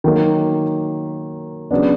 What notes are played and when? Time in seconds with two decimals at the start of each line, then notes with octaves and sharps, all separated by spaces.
0.04 D#3 F#3 A#3
1.71 C#3 F#3 B3 D4